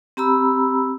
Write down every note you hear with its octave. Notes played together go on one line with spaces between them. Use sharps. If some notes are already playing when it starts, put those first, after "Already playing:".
C4 G4 A#5 B5 E6